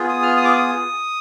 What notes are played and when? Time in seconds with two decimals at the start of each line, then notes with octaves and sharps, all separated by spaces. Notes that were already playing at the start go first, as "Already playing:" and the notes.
Already playing: B3 F4 G#4
0.09 D#6
0.22 F6
0.37 D#6
0.45 D6
0.53 D#6